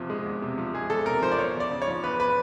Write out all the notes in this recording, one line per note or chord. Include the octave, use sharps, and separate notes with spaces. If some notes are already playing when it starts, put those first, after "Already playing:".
Already playing: E2 C3 F3
G#3
E2
C3
F3
G#3 G#4
E2 A4
C3 A#4
F3 C5
D5
E2 C#5
E2
D5
C#3
C#5
F3
E2 B4
B4